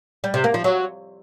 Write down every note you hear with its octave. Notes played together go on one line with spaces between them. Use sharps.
G3
C3
A#3
F3
F#3